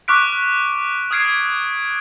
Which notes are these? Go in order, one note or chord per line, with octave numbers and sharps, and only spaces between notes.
C#6 D6 F6 F#6 B6 D7
D#6 F6 G#6 C7 D7